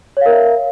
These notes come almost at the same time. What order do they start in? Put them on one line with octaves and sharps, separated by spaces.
C#5 F5 A#4 E5